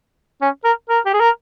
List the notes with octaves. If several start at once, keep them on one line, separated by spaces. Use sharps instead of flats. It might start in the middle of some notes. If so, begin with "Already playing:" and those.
C#4
A#4
A#4
G4
G#4
A#4